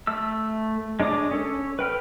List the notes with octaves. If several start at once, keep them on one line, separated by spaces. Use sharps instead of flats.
A3 E6
G#3 D4 C#5 D6 D#6
C#4 A4 C#5
B4 G5 F6